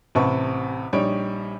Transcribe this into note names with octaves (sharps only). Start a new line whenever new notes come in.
A1 C3 B4 A5 C#6
A#1 G3 D#4 C#5 D7